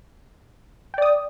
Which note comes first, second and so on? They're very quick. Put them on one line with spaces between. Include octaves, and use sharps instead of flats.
G5 D5 D#6